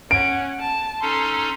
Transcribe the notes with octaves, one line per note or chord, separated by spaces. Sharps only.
C#4 F#5 D7
A5
C#4 D#4 A4 C6